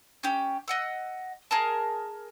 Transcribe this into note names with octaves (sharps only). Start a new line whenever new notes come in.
C#4 G4
D#5 F#5 E6
G#4 A#4 A5